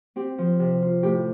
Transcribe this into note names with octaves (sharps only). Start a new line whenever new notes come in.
C4 G4
F3
C3
F4
A2 G4